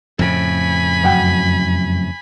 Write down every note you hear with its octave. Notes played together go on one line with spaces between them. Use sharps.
F2 A2 C#3 G#5 B5
F#2 F#5 G5